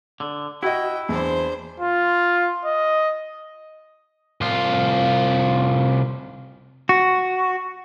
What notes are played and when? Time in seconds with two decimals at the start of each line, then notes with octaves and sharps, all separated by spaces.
0.20 D3
0.63 E4 F#4 D#5 G5
1.09 E2 D4 C5
1.80 F4
2.65 D#5
4.41 C2 F4
6.89 F#4